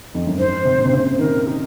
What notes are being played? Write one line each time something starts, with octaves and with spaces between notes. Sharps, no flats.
F2
F#2
G#2 C5
C3
A#2
C3
C#3
D#3 A#4
D#4